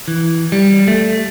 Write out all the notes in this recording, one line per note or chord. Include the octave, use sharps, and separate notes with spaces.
E3
G3
A3